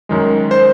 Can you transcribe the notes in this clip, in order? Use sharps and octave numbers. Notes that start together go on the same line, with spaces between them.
F#2 D#3 G#3
C5